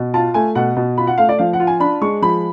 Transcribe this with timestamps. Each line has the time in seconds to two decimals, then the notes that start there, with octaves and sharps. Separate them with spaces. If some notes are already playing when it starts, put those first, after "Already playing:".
Already playing: B2
0.14 F4 A5
0.34 A3 G#5
0.55 B2 F#5
0.77 B2
0.98 F4 B5
1.07 F#5
1.18 A3 F5
1.29 D5
1.39 F3 F5
1.53 F#5
1.60 F4
1.67 G#5
1.80 D4 B5
2.01 G#3 C#6
2.22 F3 B5